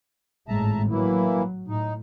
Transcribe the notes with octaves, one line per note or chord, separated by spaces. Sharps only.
G#1 A2 G#3 E5 A5 A#5
E3 F#3 A#3 E4
A2 D#4